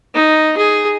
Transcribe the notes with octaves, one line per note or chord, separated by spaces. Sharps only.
D#4
G#4